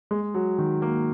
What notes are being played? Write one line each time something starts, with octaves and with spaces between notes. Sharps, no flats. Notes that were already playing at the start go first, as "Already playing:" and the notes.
G#3
F#3
D#3
A#3